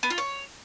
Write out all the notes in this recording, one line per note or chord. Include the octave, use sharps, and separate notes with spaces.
B3
F4
C#5